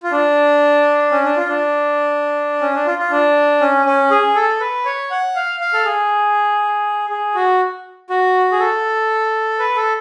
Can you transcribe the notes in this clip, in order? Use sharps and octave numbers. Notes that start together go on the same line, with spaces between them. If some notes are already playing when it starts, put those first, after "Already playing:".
F4
D4
C#4
D4
F4
D4
C#4
D4
F4
F4
D4
C#4
C#4
G#4
A4
B4
C#5
F#5
F5
F5
A4
G#4
G#4
F#4
F#4
G#4
A4
B4
A4